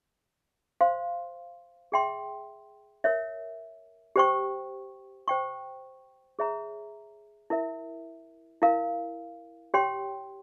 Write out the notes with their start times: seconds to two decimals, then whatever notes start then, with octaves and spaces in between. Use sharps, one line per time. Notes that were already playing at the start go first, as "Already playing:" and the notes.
0.81 C5 F5 C6
1.92 G#4 E5 G5 C6
3.04 A#4 C#5 E5
4.16 G4 C5 G5 C#6
5.28 C5 G5 C#6
6.39 G#4 C#5 E5 A#5
7.50 E4 A#4 E5
8.62 E4 A#4 F5
9.74 G4 C#5 G5 C6